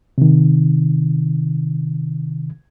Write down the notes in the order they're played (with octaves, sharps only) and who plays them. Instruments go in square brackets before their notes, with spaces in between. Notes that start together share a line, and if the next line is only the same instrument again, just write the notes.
[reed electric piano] C3 D#3